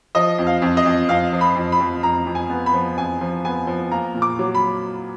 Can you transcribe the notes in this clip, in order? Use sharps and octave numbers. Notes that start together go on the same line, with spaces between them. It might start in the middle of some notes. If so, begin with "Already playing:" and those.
F3 D#5
F2
F5
F2
D#5
F2
F2 F5
F3
B5
F2
B5
F2
F2 A#5
F2
G#5
B3
B5
F3
F2 G#5
F3
B3 G#5
F3
A#3 A#5
A#2
D6
F#3
B5